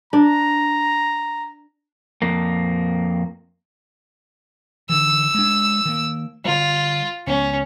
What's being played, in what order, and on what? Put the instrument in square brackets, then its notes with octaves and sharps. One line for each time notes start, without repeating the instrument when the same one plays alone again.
[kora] D4 [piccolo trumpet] A#5
[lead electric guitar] F2 A#3
[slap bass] D3 E3 [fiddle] E6
[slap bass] G#3 D4
D#3 A#3
[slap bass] D3 G3 [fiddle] F4
[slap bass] C#2 B3 [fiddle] C#4